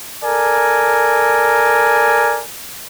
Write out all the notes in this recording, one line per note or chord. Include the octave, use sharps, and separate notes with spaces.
A4 A#4 D5 G#5